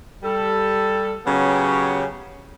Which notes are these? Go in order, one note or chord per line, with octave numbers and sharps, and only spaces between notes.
G3 A4
C#3 F#3 B3 C#4 G4 C#5